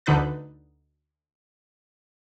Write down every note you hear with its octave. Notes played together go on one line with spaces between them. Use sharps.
D2 D3 D#4 B4 F#6 A6